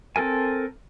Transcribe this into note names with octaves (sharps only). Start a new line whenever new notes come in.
C4 A4 A#4 G#5